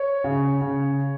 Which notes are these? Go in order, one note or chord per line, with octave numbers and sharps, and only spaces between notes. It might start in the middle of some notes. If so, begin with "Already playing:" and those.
Already playing: C#5
C#3
C#3